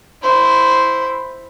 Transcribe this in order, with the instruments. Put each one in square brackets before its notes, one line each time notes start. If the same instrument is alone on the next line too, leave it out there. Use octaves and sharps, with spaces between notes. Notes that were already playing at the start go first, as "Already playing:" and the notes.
[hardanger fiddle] E4 C5